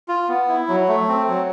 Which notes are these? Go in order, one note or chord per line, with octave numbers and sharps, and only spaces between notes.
F4
B3
E4
F#3
A3
C4
F#3